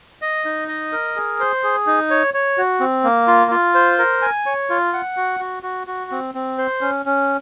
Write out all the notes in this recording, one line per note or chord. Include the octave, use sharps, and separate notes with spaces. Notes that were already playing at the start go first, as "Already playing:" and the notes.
D#5
D#4
D#5
A#4
G#4
C5
G#4
D#4
C#5
C#5
F#4
C4
A#3
F4
F4
C5
A#4
G#5
C#5
F4
F#5
F#4
F#4
F#4
F#4
C4
C4
C5
C#4
C#4